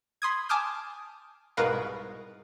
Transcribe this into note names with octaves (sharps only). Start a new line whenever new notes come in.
B5 C6 D#6 G#6
G#5 A5 D6 D#6 F6 G6
C2 G#2 B2 A#4 B4 F5